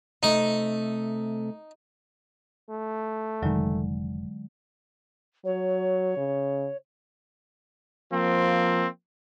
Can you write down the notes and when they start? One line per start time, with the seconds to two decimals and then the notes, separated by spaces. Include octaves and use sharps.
0.23 C3 A3 D#4
2.69 A3
3.42 F1 D3 D#3 F#3 G#3
5.45 F#3 C#5
6.17 C#3
8.12 F3 A#3 C4